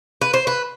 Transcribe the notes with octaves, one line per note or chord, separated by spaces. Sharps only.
B4
C5
B4